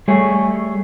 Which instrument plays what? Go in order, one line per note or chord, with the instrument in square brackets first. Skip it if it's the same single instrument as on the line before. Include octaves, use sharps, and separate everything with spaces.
[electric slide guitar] G3 A3 G#4 C#5